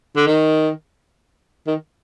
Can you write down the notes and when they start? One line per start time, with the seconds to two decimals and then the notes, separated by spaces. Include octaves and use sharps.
0.17 D3
0.27 D#3
1.67 D#3